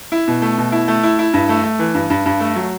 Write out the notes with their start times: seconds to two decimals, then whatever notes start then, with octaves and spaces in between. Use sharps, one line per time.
0.12 E4
0.28 B2
0.42 A3
0.58 B2
0.72 E4
0.88 A3
1.03 E4
1.19 E4
1.34 G2
1.49 A3
1.64 A3
1.79 E3
1.94 G2
2.10 G2
2.26 G2
2.40 A3
2.56 F#3